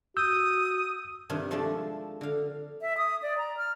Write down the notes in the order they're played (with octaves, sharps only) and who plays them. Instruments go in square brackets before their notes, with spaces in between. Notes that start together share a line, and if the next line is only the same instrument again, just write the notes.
[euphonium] F#4 [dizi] D#6 [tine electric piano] E6 G6
[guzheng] G2 C3 D#3 D4 F4
F3 G#3 A3 D4 A4 A5
D3 F5
[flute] E5
D#6
D5
A#5
F6